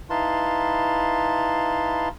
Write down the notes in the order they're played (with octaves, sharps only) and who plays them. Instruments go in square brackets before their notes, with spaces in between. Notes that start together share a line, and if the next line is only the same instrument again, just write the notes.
[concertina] D#4 E4 B4 F5 A5 C6